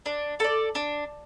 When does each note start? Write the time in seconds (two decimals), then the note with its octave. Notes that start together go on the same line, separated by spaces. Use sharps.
0.06 D4
0.40 A4 D5
0.75 D4